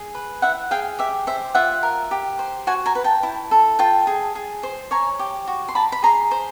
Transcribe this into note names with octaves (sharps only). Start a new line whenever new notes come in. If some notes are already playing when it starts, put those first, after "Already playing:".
Already playing: G#4
B4
E4 E5 F#5
G#4 F5 G5
G4 E5
C5 E5
F4 E5 F#5
A#4
G4
C5
F#4 F#5 G#5
G#5 A#5
B4
G5 A5
E4
A4
F4 G5 A5
G#4
G#4
C5
C#5 G#5 A#5
G4
F#4
C6
A#4 A5 B5
B5
G#4 A#5 C6
C5